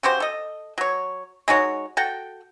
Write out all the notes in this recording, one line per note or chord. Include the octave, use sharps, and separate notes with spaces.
C#3 F#4 G4 C5
A4 D#5
F#3 C#5
G#3 D#4 F#4 C#5
F#4 A4 F#5 G5